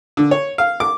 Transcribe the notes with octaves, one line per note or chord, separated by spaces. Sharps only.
D3
C#5
F5
D6